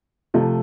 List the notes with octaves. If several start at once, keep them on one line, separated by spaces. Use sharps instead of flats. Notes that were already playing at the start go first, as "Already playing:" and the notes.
C3 F3 A3